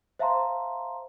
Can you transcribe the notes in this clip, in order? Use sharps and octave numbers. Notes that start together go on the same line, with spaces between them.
C5 E5 F5 A5 A#5 C6